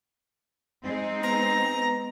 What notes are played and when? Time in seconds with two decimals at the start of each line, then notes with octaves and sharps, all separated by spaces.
0.83 G#3 C4 D#4
1.23 B3 A#5